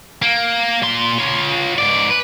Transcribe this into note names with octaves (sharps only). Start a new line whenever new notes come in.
A#3
A#2 C6
F4 C#5
G#2 D5
B4